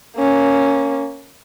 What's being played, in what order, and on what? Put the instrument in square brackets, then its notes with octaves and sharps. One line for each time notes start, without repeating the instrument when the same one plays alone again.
[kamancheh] A#3 C#4